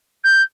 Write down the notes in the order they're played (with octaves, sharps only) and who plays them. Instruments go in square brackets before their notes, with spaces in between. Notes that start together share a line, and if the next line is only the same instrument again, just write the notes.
[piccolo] G6